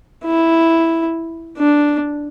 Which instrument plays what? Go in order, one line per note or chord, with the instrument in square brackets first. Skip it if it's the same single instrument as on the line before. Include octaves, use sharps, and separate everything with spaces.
[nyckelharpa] E4
D4